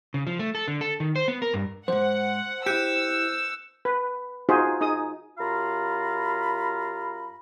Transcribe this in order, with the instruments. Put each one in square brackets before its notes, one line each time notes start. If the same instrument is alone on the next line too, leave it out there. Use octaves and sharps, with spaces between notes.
[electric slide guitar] C#3
F3
A3
A4
D3
A4
D#3
C5
B3
A#4
G2
[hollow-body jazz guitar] F2 G#2 [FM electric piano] C5 [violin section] F#5
[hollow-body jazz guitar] E4 G4 [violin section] E6 [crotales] F#6 G6 C#7
[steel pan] B4
D#4 F4 F#4 G#4 C5
D#4 G#4 D#6
[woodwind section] F#2 F4 G4 F5 A#5 B5